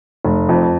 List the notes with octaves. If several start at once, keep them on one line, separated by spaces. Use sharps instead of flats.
F1
F2